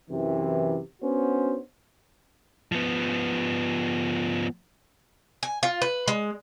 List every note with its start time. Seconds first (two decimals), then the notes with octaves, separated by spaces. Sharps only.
0.10 F#2 C3 E3
1.02 B3 C#4 D4 F#4 C5
2.72 F3 B3
5.43 G#5
5.63 F4
5.82 B4
6.08 G#3